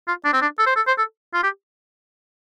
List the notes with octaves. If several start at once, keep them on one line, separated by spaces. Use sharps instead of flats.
F4
D4
C4
D4
A4
C5
A4
C5
A4
F4
G4